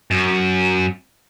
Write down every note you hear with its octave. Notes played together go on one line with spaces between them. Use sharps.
F#2